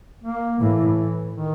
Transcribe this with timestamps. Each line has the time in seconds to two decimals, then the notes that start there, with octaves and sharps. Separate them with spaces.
0.23 A#3
0.59 A2 E3
1.33 D#3